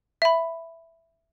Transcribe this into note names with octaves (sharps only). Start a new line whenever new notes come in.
E5 B5